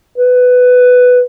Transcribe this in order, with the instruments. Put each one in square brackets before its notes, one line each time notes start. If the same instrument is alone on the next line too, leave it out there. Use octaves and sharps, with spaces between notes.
[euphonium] B4